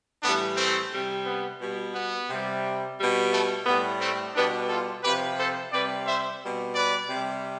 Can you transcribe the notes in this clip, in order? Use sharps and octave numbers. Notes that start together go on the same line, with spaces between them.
A2 E3 G3 B3 D4
A3 C4
C3 G3
B3
B2 G3
B3
C3 G3
B2 G3
A3
A2 G3 B3
A3 C4
B2 G3 B3 D4
F4 A4
C3 F3 G4 B4
A4 C5
C3 G3 B4 D5
C5 E5
B2 G3
B4 D5
C3 G3